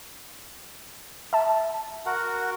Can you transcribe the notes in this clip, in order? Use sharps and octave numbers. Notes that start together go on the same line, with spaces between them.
E5 A5
F#4 A#4 F#5